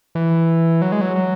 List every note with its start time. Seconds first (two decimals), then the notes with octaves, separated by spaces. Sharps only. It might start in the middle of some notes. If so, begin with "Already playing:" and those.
0.15 E3
0.82 F#3
0.92 G#3
1.01 F#3
1.16 F#3